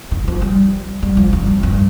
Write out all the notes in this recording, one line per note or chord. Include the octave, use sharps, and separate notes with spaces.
D#3
F3
G3
G3
F3
G2
F2
G2